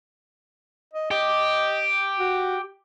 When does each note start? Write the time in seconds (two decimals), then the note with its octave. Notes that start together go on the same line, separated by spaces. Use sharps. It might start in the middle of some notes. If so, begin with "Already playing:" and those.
0.93 D#5
1.11 G4 D#5
2.19 F#4